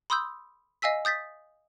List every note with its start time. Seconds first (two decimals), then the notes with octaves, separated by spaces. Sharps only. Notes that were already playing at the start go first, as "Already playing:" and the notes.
0.10 B5 C6 D#6 E6 G6
0.82 D#5 F5 G#5 E6 B6
1.05 D#6 G6 A6 B6